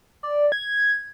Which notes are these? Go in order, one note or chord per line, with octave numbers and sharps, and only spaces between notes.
D5
G#6